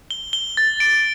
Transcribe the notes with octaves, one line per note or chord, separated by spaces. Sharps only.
G7
G7
A6
D7